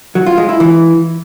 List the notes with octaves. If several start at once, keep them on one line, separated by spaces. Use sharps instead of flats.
F#3
F4
G#3
E4
E3